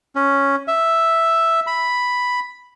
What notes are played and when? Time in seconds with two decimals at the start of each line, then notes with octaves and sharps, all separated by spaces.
0.16 C#4
0.68 E5
1.67 B5